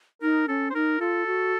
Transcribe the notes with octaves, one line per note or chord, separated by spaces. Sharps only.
D#4 A#4
C#4 A4
C5
D#4 A#4
F4 A4
F#4